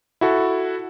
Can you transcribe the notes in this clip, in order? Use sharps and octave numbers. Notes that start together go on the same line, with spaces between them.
E4 F#4 A4